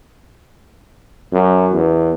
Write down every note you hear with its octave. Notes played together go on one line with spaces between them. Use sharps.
F#2
E2